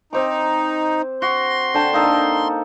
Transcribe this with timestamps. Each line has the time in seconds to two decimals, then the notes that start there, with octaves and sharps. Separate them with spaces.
0.13 C4 D#4 C5 D6
1.22 F#4 C6
1.74 D3 G5 A5
1.93 A#3 D#4 A4